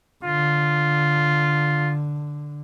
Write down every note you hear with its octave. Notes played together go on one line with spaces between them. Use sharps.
D3 F4